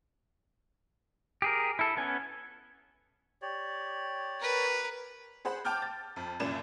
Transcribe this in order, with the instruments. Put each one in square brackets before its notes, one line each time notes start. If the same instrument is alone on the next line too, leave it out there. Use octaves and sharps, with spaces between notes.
[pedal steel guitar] G4 G#4 A#4
E4 A4
B3 C#4 G#5
[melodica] G4 C#5 D5
[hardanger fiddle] A#4 B4
[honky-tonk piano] G#4 C5 F#5 B5
G5 A5 D6 F6 G6
A6
F2
C2 F#2 A#2 C#3 D5 E7